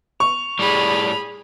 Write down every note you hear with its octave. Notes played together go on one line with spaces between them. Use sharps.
C#6 F7
A2 G3 G#4 B5